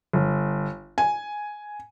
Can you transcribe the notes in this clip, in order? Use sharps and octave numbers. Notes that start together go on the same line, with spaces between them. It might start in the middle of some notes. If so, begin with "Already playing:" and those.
G1
G#5